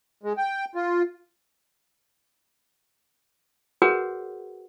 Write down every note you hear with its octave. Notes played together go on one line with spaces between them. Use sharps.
G#3
G5
F4
F#4 G#4 A#4 B4 C#5 F#5